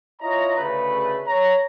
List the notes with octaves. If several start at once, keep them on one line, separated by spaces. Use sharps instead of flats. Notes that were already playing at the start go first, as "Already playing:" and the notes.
E4 F4 C#5 D#5 A#5
D2 C#3 A3 B4
C#5 A#5